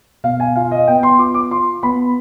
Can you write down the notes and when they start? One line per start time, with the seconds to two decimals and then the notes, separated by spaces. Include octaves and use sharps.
0.24 B2 F5
0.40 G#5
0.56 F4 F5
0.71 D#5
0.87 B3 G5
1.03 C6
1.18 F4 D6
1.34 D6
1.51 F4 C6
1.83 B3 B5